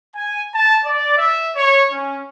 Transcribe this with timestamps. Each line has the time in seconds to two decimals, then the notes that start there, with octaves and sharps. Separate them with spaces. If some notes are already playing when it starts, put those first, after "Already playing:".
0.15 G#5
0.54 A5
0.85 D5
1.16 E5
1.54 C#5
1.90 C#4